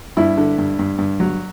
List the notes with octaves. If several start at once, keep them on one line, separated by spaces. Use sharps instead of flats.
G2 E4
D3
G2
G2
G2
F#3